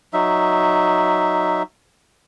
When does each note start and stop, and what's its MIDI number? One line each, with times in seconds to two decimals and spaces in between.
0.13 1.62 54
0.13 1.62 63
0.13 1.62 76